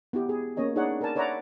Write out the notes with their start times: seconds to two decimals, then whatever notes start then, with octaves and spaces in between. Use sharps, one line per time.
0.13 B3 E4 G4
0.29 G#4
0.57 A#3 C#4 C#5 D#5 G#5
0.76 D4 D#4 G#4 C#5 D5 F#5
1.01 A#4 B4 D5 G#5 A5
1.16 B4 C#5 D5 E5 F#5 A#5